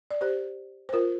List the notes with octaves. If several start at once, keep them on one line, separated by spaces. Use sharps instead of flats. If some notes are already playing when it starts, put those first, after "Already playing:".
D5
G4 C5
C5
F4 A#4